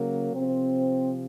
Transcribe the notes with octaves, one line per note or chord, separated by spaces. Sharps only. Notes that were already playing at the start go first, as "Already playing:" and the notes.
Already playing: C#3 F#3 A#3
C3 F3 C4